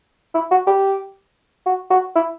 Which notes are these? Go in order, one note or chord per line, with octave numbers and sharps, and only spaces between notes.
E4
F#4
G4
F#4
F#4
E4